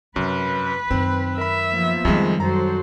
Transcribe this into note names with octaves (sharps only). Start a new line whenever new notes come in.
F#2 C3 B4
F#2 D#3 C4
A#4 E5 B5
F3 A#3 B3
F2 D#3 G3 G#3
F#2 F#3 A4 C5 A#5